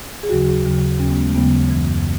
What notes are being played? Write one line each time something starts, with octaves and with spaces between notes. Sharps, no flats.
G#4
D#2 C#3 F#3 F#4
D#2 C#3 F#3
D#2 C#3 F#3 C#4
B3
G#3
A3
D#2 C#3 F#3 B3
F#2 E3